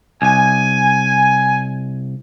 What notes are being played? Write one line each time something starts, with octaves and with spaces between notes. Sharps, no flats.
C2 G#5